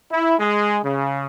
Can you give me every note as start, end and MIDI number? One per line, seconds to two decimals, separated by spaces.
0.10 0.35 64
0.39 0.78 56
0.83 1.27 49